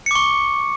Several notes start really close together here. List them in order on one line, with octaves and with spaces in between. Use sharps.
C#7 D6 C#6